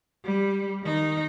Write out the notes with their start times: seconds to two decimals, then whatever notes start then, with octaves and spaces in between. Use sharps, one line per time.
0.24 G3
0.83 D#3 D#4